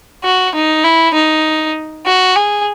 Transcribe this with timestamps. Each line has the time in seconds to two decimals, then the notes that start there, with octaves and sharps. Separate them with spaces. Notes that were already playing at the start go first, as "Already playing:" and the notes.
0.24 F#4
0.54 D#4
0.84 E4
1.14 D#4
2.06 F#4
2.36 G#4